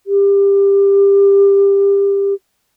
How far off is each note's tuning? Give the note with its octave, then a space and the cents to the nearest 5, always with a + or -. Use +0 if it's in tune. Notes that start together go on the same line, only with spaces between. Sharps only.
G4 +20